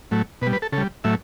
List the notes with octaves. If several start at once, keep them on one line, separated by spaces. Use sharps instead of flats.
A2 F#3 A3
B2 B4
G3
B4
A4
C#3 A4
G3
A2 F#3 A3 E5